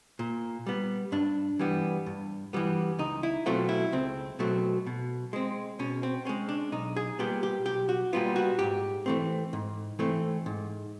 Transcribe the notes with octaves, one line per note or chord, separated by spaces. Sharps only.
A#2
G3 B3
G2 D4
E3 G3 B3
G2
E3 G3 B3
C#2 D#4
E4
B2 F#3 A3 C4 F4
E4
C#2 C4
B2 F#3 A3 C4
B2
G#3 C4
B2 C#4
C4
G#3 C4 C#4
D4
B1 D#4
G#4
A#2 G3 B3 G4
G4
B1 G4
F#4
A#2 G3 B3 F4
F#4
G#2 G4
E3 A3 C4
G#2
E3 A3 C4
G#2